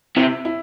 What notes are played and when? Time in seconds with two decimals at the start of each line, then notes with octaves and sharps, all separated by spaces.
0.16 C3 E4
0.45 E4